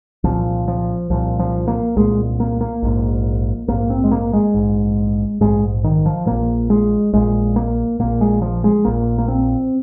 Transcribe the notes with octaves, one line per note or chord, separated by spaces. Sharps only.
C2 A#2 F3
F3
C2 A#2 F3
F3
A#3
C2 A#2 G#3
A#3
A#3
A#1 G#2
A#1 G#2 A#3
C4
G#3
A#3
G#3
A#1 G#2
A#1 G#2 G#3
D#3
F3
A#1 A#2 A#3
G#3
A#1 A#2 G#3
A#3
A#1 A#2 A#3
G#3
F3
G#3
A#1 A#2 A#3
A#3
C4